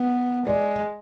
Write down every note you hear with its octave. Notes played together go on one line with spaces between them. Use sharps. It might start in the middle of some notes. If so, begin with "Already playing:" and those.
Already playing: B3
G#3 D5